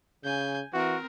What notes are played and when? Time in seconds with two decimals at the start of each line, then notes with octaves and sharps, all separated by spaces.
0.24 C#3 G#5 G6
0.73 E3 C4 F#4 A#4